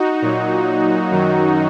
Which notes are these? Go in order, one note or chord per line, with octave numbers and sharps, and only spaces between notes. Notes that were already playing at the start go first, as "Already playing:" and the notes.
Already playing: D#4 F#4
A#2 F#3
F#2 D#3 F#3